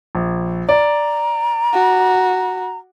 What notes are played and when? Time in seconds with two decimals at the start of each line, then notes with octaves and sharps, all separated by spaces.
0.15 A#1
0.69 D5 A#5
1.73 F#4